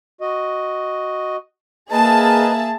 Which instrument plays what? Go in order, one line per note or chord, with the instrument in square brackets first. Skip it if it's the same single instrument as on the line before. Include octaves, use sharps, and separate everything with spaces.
[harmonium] F#4 D#5
[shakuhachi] A#3 [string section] G#4 E5 A5 [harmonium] B4 D#5 A#5